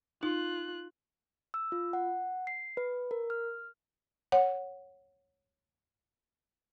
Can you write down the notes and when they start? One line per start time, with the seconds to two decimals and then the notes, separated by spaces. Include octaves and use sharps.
0.23 D#4 F4 F#6
1.54 E6
1.72 F4
1.93 F#5
2.47 C7
2.77 B4
3.11 A#4
3.30 F6
4.32 C#5 F#5